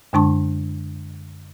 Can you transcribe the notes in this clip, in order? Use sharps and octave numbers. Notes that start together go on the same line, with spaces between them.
F#2 D3 G#3 D4 A5 C#6